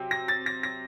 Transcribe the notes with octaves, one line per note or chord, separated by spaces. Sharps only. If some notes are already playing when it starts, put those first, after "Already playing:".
Already playing: C3 F#3 C4
A#6
A6
A#6
A#6